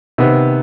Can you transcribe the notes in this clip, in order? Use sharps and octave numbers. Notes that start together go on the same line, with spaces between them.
C3 D#3 B3